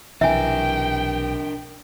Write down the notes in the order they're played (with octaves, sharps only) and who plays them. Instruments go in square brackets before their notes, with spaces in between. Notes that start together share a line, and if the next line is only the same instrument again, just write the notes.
[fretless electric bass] B1 C3 E3 [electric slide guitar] D4 A#4 [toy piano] E5 G#5 [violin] G5